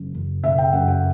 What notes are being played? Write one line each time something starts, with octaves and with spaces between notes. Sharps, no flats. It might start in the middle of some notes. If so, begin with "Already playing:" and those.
Already playing: F#1 F#2
F#1
C#3 E5
G5
F#2 F#5
F#5